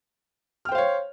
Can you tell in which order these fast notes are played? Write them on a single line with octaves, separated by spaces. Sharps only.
F6 G5 C5 F5 C#5